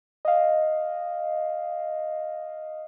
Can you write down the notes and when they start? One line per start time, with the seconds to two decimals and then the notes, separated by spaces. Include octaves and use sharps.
0.25 D#5 F5